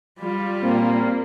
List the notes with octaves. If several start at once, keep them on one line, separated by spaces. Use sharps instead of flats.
G3 F4
A#2 A#3 C4